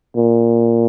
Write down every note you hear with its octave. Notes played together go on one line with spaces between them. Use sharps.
A#2